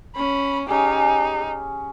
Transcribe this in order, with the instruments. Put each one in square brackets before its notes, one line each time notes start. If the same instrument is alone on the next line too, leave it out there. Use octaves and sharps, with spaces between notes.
[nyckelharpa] C#4 [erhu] B5
[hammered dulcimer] C#4 G#4 [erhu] D#4 [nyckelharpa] G4